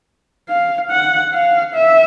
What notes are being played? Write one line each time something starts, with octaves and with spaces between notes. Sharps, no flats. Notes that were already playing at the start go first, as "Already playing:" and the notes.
F5
F#5
F5
E5